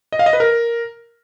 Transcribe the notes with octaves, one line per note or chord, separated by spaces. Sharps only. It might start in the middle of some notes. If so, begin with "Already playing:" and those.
D#5
F5
D#5
B4
A#4